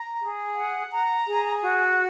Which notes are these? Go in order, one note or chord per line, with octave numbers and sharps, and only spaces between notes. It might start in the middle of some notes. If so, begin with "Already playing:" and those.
Already playing: A#5
G#4
F#5
A#5
G#4
F#4